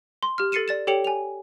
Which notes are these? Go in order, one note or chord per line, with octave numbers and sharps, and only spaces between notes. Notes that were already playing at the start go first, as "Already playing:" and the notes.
C6
G4 F6
A4 A6 C7 C#7 D#7 E7
D5 A6 E7
G4 A4 C#5 G5 C#7 F7
G#5 F7